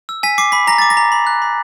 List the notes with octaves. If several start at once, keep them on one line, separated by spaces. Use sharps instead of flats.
E6
G#5 B6
D6 C7
B5 B6
A#5 A#6
D6 A6
A#6
A#5
B5
F#6
B5